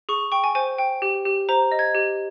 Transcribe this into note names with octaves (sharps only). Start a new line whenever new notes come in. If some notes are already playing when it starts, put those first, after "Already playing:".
G#4 C#6
G5 C#6
G#5
C5 G#5
G5
G4
G4
C5 A#5
D#5
G#6
G4